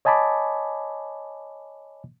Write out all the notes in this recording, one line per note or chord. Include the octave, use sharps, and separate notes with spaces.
C#5 D#5 G#5 A5 B5 D6